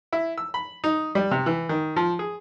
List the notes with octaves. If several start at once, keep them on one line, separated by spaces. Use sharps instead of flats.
E4
E6
B5
D#4
G3
C3
E3
D#3
F3
G#4